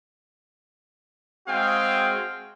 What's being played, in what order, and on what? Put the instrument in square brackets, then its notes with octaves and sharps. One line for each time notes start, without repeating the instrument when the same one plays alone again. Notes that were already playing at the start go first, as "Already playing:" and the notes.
[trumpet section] G#3 C4 F#4 G#4 F5 G5